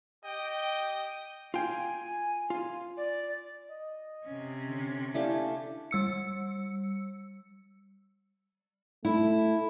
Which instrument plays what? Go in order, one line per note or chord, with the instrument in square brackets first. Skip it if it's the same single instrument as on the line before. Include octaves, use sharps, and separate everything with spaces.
[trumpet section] G4 D#5 G5
[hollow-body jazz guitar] F4 G5 [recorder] G#5
[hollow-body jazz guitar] F4
[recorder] D5
[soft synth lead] D#5
[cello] C3 C#4
[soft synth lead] D3
[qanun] A3 D4 G4 [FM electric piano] E4 D5 F5 [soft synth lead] G#5
[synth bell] G3 E6 C#7
[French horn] A3 [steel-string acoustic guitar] E4